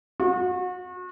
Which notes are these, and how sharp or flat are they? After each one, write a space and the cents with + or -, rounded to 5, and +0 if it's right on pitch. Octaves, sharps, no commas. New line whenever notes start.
F#4 -35